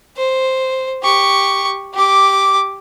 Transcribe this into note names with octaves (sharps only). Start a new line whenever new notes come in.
C5
G4 C#6
G4 D6